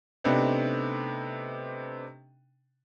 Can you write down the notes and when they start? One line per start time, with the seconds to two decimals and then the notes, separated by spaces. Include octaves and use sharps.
0.24 C3 A3 B3 C4 D4 D#4